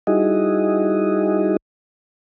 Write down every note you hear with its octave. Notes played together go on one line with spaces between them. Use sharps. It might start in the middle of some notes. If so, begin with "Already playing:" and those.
G3 D#4 E4 F#4 G#4 D#5